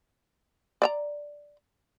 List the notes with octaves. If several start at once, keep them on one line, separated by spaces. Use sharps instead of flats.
D5 E5 A#5